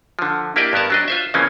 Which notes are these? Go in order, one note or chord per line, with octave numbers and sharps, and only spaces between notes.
D3 F3
A#3 E4 G4 D5 D#5
G2 B3 A#4 A5
F#3 D4 D#5
F4 C5 E5
C#3 E3 F3 A#3 C4 C#4